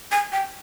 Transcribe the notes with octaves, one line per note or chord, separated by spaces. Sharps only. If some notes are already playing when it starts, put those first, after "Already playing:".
G#5
G5